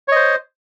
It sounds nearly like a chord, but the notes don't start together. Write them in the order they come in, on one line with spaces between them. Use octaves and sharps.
C#5 D#5 C5